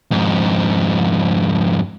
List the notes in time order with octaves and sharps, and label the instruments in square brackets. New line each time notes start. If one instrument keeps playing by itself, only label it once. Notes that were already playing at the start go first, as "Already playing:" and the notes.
[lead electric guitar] F2 G#2